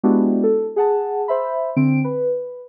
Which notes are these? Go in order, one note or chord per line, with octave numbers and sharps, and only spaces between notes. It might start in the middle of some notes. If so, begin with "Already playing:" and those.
G#3 B3 D4 E4 F#4 G4
A4
G#4 F#5 A5
C5 E5 B5
D3 C4 D7
B4